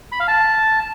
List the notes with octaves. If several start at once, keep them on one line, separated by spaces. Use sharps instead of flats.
B5
F5
A5